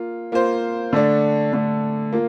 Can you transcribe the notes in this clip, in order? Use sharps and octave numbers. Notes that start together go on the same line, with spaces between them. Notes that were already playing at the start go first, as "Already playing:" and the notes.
Already playing: A#3 F4
A#3 F4 C5
D3 A3 D4
D3 A3 D4
A#3 F4